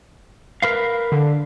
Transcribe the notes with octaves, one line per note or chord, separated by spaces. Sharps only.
A#4 B4 F5
D3